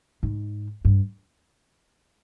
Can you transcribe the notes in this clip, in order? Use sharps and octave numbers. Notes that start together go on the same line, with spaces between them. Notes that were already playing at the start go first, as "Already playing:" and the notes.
G#2
G2